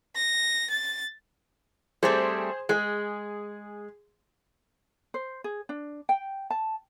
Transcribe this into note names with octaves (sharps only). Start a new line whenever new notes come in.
A#6
A6
G3 A3 C4 G#4 C5
G#3 G#4
C5
G#4
D4
G5
A5